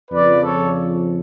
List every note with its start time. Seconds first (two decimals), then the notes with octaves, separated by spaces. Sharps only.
0.11 F2 C#3 F3 B4 D5
0.42 A4 C#5